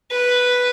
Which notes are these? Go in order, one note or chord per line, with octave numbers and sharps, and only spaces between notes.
B4